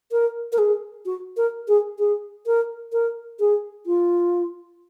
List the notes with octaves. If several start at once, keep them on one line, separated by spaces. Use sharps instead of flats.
A#4
A#4
G#4
F#4
A#4
G#4
G#4
A#4
A#4
G#4
F4